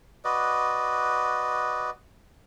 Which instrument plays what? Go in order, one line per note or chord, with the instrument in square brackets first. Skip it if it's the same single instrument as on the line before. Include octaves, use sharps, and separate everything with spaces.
[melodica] F#4 B4 D5 D#5